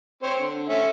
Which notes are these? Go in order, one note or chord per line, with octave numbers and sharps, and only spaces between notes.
C4 C5 C#5
D3
A3 C#4 E5